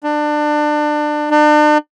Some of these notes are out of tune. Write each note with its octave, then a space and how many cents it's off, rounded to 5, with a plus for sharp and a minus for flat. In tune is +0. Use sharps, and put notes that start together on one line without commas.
D4 +25
D4 +40